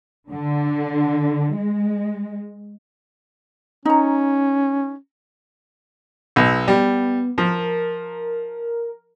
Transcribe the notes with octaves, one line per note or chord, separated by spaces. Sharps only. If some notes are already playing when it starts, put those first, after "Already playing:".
D3
G#3
C#4 D#4 A#5
B1 E6
G3 B3
F3 A#4